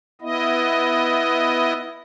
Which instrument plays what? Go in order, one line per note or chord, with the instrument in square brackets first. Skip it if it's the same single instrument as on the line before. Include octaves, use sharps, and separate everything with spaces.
[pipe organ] B3 E4 D#5